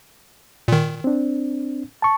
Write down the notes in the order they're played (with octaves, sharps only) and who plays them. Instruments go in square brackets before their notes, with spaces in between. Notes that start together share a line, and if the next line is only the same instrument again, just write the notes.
[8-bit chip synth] A#2 D#3
[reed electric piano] C4 D4
A5 C#6